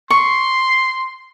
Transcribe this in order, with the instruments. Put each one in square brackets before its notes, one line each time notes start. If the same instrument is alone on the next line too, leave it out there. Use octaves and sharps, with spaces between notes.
[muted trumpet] C6 [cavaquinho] C#6